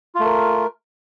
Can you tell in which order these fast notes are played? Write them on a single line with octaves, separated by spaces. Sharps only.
F4 A3 A#4